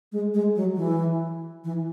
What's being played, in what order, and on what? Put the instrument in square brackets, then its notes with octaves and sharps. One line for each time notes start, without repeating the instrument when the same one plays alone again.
[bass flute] G#3
G#3
F#3
E3
E3